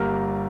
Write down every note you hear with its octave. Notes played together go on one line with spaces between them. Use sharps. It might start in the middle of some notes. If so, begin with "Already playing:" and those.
Already playing: G1 G2 G3 A#3 A#4